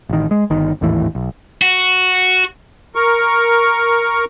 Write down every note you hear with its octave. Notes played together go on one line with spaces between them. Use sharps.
A1 D#3
G#3
G1 D#3
G#1 D#2 A2 E3
B1
F#4
A#4 C#6